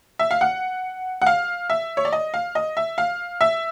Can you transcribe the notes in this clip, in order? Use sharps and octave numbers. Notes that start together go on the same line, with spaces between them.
E5
F5
F#5
F#5
F5
E5
C#5
D5
D#5
F5
D#5
E5
F5
E5